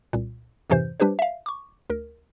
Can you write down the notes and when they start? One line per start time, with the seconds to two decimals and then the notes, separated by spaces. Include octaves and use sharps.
0.13 C2 A#2
0.70 F2 G#2 C3 E3 C5 G6
1.00 G3 D4 G4 B4 C5
1.19 E5 F5
1.46 C#6 D6
1.90 D2 A#4